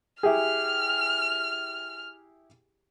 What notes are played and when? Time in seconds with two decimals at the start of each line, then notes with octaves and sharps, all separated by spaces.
0.23 E4 G4 G#4 F6